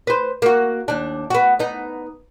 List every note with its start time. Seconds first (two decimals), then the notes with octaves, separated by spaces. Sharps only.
0.07 B4 C5
0.42 A#3 F#4
0.88 D#2 D4
1.30 B3 F#4
1.59 B3 D#4